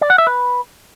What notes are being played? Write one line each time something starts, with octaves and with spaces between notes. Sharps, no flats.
D5
F#5
E5
B4